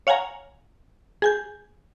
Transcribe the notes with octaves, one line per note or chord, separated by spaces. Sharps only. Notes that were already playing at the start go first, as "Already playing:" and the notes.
C#5 F5 F#5 G#5 A#5
G#4 G#5 G6